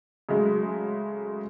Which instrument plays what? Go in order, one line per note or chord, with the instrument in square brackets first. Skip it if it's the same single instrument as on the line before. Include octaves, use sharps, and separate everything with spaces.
[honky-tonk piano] C#3 F#3 G#3 A3